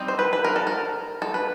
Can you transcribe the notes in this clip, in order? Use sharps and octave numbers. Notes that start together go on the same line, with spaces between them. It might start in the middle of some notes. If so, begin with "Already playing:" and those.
Already playing: G3 C4 D#4
C5
B4
B4
A#4
A4
A#4
A4
B4